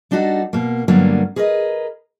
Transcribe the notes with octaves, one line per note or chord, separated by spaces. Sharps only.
G3 D4 D#4 F#4 A4
B2 A#3
G2 D3 F#3 G3 A#3 B3
G#4 A#4 B4 D5 D#5